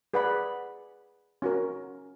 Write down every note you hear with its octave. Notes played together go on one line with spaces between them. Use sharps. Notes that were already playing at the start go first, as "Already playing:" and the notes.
G#4 B4 D5 F#5 B5
C#4 F#4 A#4